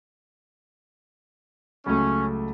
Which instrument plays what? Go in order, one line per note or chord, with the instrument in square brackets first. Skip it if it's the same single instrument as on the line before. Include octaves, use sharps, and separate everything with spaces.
[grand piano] C#2 F#3 A3 [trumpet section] C#4